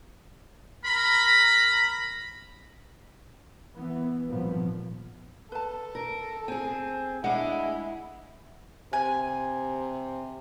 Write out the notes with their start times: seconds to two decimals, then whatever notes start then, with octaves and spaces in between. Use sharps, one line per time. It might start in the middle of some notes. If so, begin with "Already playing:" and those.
0.84 A#4 A#5 B5
3.74 E3 B3
4.27 G#1 G2 A#2 F3 B3
5.52 A4 B4 A5
5.95 A#4
6.48 C4 G#4 G#5
7.24 G#3 D4 E4 F#5
8.93 C3 G#5